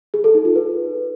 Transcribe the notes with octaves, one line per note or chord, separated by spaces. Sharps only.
G#4
A4
D#4
F4
B4